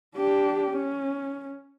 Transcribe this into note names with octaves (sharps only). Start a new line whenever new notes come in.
D4 G4
C#4